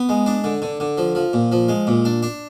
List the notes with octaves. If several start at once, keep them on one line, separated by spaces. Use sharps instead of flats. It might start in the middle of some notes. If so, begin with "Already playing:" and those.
Already playing: B3
G#3
D4
D3
D3
D3
F3
F3
A#2
F3
G#3
A#2
D4
D4